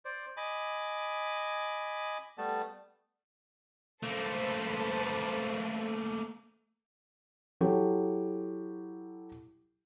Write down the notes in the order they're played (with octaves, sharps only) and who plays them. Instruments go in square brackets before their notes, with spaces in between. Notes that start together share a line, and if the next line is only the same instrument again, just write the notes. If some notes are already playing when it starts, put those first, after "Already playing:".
[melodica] C5 D5
D#5 G#5 B5 D6
G3 A3 B3 A5
[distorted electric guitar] A3 A#3 [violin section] A4 B4 C5
[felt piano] F#3 E4 G4 A4